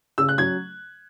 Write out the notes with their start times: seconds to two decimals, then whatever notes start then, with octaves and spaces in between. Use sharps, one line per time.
0.18 C#3 E6
0.29 F#6
0.38 F#3 C#4 G#6